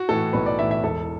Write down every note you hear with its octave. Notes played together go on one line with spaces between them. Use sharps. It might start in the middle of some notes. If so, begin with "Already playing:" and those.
Already playing: F#4
A2 E3 A4
B1 B4
D5
A2 E3 E5
E5
E1 A4